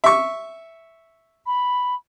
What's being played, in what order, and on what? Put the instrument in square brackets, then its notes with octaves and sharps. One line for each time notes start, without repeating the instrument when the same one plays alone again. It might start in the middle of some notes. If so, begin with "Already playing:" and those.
[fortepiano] E5 C#6
[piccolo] B5